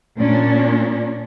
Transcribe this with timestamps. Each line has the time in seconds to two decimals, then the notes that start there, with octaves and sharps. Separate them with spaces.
0.18 A#2 C#4 D4